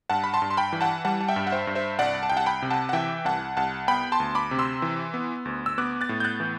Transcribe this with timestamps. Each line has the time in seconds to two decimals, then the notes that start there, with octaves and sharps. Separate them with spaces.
0.10 G2 F#5 A5
0.24 B5
0.34 A5 C6
0.42 G2
0.50 C6
0.57 G5 B5
0.73 E3
0.81 F#5 A5
1.05 G3 F#5 A5
1.21 A5
1.29 E5 G5
1.36 G2
1.47 F#5
1.52 C5 E5
1.67 G2
1.75 C5 E5
1.99 C2 D5 F#5
2.23 A5
2.30 C2 G5
2.37 F#5 A5
2.46 G5 B5
2.62 C3
2.70 F#5 A5
2.89 F#5
2.93 E3 E5 G5
3.25 C2 F#5 A5
3.57 C2 F#5 A5
3.88 B3 G5 B5
4.12 A5 C6
4.20 D2
4.35 B5 D6
4.51 C3
4.59 C6 E6
4.82 E3
5.14 B3
5.45 D2
5.66 E6
5.78 B3 D6 F#6
6.01 F#6 A6
6.09 A2
6.20 G6
6.25 F#6 A6
6.40 E3